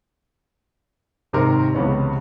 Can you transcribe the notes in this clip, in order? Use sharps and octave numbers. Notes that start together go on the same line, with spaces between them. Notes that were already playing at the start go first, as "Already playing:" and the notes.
G#1 C3 D#3 A#4 C6
C#2 C3 E3 B3 C#4